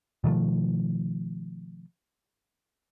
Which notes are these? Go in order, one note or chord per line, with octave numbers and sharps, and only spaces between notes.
B2 D#3 F3 A3